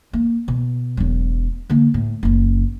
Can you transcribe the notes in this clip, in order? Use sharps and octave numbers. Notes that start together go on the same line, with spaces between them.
A#3
B2
E1 F#3
D3 A#3
A2
F#1 C#4